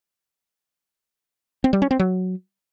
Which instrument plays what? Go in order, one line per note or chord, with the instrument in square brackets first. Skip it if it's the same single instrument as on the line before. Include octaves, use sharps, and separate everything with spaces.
[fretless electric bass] C4
G3
C#4
C4
F#3